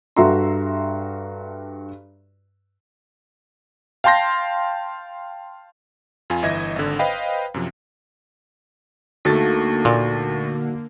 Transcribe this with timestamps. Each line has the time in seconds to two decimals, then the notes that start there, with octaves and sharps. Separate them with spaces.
0.16 G2 F#4 A4 E5 A#5 C6
4.04 F5 G5 A5 C6 G6 A#6
6.30 F2 F4 G#5
6.42 G1 E3 D#5 E5 G#6 A#6
6.76 G#1 D3
6.99 B4 C5 D#5 F5 G5 B5
7.54 F#2 C3 F3
9.25 D2 D3 A3 A#3 D#4 F#4 A6
9.85 A#2